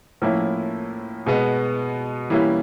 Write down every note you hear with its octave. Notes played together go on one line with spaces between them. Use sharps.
A2 F3 A#3 C#4 E4
B2 G#3 B3
E3 G3 A#3 C#4 E4